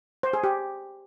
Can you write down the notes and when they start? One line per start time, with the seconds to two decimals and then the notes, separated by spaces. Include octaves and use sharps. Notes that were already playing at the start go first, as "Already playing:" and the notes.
0.23 C5
0.33 G#4
0.44 G4